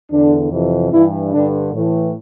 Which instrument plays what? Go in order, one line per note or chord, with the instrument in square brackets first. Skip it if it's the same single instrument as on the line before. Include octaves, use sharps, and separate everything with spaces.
[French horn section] E2 D3 D4
F2 C3 E3
G2 E3 E4
G2 D3 D4
A2 E3